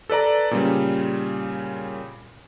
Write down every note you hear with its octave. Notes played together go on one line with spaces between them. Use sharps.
A4 B4 D5 A#5
A#2 C#3 G3